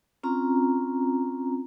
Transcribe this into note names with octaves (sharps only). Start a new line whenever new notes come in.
C4 C#4 F4 A#5